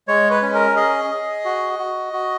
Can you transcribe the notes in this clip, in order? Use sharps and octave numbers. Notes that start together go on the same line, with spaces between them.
G#3 C#5
B4
C#4
A#4
G#4 D#5
G#4
F#4
F#4
F#4